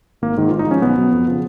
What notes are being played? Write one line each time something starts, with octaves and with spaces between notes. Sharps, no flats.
G#1 A#3
G#2 D#3
G#1 F4
D#4
G#2 F3 C#4
B1 B3
B2 F#3
F2
C#3 F3